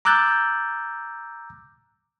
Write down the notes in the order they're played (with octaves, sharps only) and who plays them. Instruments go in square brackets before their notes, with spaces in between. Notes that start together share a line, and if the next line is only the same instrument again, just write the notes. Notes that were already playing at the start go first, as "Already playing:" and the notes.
[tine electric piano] A#5 D6 E6 F#6 G6 A6